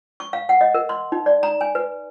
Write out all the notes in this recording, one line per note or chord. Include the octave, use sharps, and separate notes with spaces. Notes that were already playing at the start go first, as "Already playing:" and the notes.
C#6
F5
F#5
D#5
A#4
C6
D#4
D5
A#5
G#5
B4